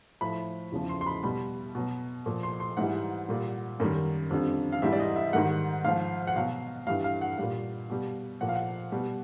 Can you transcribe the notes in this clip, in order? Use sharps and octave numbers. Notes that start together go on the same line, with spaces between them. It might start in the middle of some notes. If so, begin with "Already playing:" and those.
A2 F3 B5
E2 C#3 F3
C6
C6
B5
B2 G3 B5
B2 F#3
A#2 F3
C6
C6
G#2 E3 G3 F#5
A#2 G3
F#2 D#3 G3
F2 D3 G3
F5
G#2 E3 G3 E5
D5
D#5
E5
G#2 D#3 G3 F#5
G#2 F3 F5
F#5
B2 F#3 F5
G2 E3 G3 F5
F5
F#5
A#2 G3 F5
B2 G3
A#2 F3 F#5
F5
F#5
B2 G3